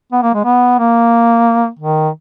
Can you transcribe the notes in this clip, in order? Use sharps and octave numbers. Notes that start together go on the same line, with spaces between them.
B3
A#3
G#3
B3
A#3
D#3